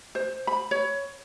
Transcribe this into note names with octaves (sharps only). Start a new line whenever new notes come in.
C5
B5
C#5